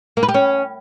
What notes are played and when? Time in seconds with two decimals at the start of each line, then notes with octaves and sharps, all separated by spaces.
0.17 A#3
0.23 B4
0.29 G4
0.34 C#4